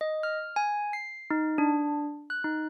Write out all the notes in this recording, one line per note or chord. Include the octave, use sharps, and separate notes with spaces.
D#5
F6
G#5
C7
D#4
D4
F#6
D#4